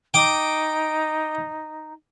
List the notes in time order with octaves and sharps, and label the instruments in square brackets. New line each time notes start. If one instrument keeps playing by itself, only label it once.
[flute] D#4 [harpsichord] G5 D6 D#6